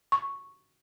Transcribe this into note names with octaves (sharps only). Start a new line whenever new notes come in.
C#6